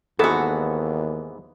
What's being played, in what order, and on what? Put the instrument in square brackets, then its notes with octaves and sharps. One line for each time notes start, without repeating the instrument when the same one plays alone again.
[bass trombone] D#2 [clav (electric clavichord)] G#2 E3 B3 [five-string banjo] F#4 A4